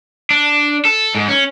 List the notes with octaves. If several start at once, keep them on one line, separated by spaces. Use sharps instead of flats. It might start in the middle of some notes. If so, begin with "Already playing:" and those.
D4
A4
G#2
C#4